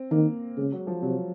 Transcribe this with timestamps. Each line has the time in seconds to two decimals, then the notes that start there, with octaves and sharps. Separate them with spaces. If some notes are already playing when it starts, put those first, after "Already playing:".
Already playing: C4
0.11 D#3 A#3
0.57 C#3 G#3
0.72 F#3
0.87 F3
1.02 C3 F#3